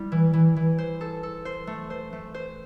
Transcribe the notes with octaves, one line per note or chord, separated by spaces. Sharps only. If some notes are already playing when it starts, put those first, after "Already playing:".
Already playing: G3 E4
E3
E3
E3
C5
A4
A4
C5
A3
C5
A3
C5